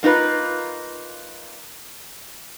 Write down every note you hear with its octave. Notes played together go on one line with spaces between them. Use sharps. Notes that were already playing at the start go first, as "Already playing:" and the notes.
A#3 D#4 F4 B4